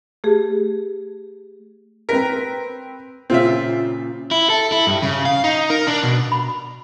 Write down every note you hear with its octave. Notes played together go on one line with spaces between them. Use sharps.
A3 G4 G#4
C4 A#4 B4 B6
A#2 C#3 C4 F4 E5
E4
A4
E4
G2
C#3
F5
D#4
A#4
D4
B2
B5